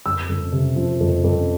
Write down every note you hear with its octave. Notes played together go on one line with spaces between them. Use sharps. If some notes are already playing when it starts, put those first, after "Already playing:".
F2 E6
F2
C3
F3
F2
F2